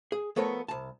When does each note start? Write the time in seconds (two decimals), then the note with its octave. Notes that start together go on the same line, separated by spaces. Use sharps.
0.12 G#4
0.36 F3 A3 B3 A4 A#4 C#5
0.68 C2 A5